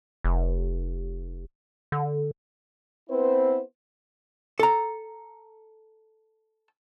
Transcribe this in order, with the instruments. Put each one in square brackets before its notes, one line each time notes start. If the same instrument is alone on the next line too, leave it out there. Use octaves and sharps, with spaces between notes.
[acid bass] F1
D3
[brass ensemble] B3 C4 E4 B4 C5
[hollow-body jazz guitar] A4 A#5